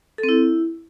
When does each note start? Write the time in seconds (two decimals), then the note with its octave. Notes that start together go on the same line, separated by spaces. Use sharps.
0.18 A4
0.23 C4
0.29 E4